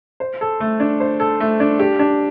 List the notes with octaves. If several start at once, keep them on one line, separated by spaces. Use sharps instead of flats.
C5
A4
A3
D4
C5
A4
A3
D4
G4
D4